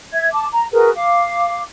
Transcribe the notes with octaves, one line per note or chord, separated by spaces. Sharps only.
E5 G#6
A5 D6
A#5
F#4 G#4 A#4 B4
F5 D6